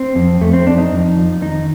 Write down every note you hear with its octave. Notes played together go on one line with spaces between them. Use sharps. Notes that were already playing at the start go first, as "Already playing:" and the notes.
Already playing: C4
F2
F2 A3
C4
F2 D4
D#4
F2
F3
D#3 D#4